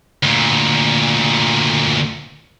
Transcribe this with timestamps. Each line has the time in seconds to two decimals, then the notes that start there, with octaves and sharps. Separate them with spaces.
0.23 D2 A#2